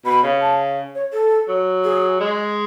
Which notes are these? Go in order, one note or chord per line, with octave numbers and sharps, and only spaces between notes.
B2 B5
C#3
A5
C#5
A4
F#3
G#4
G#3